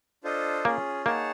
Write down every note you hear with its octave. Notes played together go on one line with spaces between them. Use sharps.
D4 F4 A4 C5 D#5
A#3 C#4 F4 G#4
A#3 D#4 G#4 C#5 F#5 A5